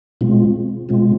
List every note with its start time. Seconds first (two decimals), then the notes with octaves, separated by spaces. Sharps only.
0.21 B2 G#3 C4 F4
0.89 B2 G#3 C4 F4